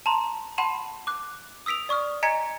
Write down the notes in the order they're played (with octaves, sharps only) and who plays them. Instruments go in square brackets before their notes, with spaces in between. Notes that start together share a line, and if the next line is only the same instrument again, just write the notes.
[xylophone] A5 A#5 C6
F#5 A5 B5 C6 D#7 E7
D6 F#6
D#6 E6 B6 D7 F7
D5 C#6 D#6 F6
D#5 G#5 A#5 G#6 B6 C#7